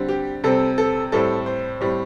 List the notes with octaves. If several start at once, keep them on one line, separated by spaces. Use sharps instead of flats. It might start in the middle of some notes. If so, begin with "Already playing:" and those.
Already playing: D3 G3 C4
G4
C3 G3 C4 A4
A4
A2 G3 C4 A4
C5
A2 G3 C4